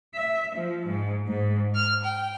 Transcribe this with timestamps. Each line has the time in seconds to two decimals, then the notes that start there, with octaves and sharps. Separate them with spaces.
0.15 E5
0.55 F3
0.87 G#2
1.27 G#2
1.75 F6
2.04 G5